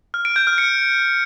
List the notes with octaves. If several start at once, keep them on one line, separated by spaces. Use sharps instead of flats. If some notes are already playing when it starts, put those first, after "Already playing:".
F6
D7
G6
F6
C#7